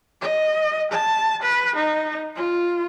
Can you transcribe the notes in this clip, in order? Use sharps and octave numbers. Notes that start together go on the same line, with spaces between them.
D#5
A5
B4
D#4
F4